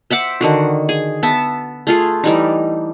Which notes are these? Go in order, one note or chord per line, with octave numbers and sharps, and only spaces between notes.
C5 E5 F#5 D6
D3 D#3 F#4
G#4
B3 E5 A5
A3 F4 G#4
E3 G3 D#4